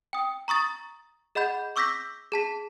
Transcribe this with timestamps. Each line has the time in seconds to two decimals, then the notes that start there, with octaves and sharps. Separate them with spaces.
0.13 G5 D#6
0.48 A#5 C#6 D#6 A6
1.35 G#4 D#5 F#5 B5 G6
1.76 C#6 D6 E6 G6 A#6 B6
2.32 G#4 A5 B6